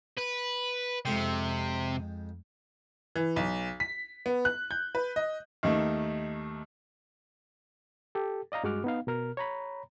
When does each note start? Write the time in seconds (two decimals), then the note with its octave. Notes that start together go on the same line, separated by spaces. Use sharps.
0.18 B4
1.05 F2 C3 G#3 G5
3.16 E3
3.36 B1
3.80 B6
4.26 B3
4.45 F#6
4.71 G6
4.95 B4
5.16 D#5
5.63 D#2 D#3 A3
8.15 G4 A4
8.52 D5 D#5 F5 A#5
8.63 G2 G#3 F#4 F#5 D6 F6
8.84 B3 D#4 F5
9.07 B2 A#4 F6
9.37 C#5 A#5 B5